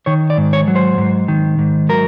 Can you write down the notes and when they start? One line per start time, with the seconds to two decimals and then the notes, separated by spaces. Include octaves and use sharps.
0.06 D#3 C#5
0.30 D5
0.38 G#2
0.53 C#5
0.68 F#3
0.76 C5
0.98 G#2
1.28 D#3
1.59 G#2
1.89 F#3 A#4